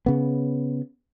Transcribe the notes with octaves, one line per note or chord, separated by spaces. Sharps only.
C#3 B3